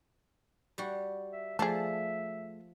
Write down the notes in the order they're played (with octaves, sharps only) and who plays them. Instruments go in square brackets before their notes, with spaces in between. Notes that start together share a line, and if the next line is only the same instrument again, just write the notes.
[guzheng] G3 F#4
[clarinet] E5
[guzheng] F3 D5 [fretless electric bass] A3 [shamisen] G#4 A4 [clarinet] E5